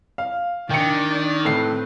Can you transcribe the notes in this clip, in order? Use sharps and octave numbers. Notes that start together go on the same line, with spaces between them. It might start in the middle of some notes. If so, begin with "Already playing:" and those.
F5
D#3 D4 D5 G5 C#7
A2 C4 B4 C7